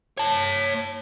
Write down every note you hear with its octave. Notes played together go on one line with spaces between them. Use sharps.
C#5 A5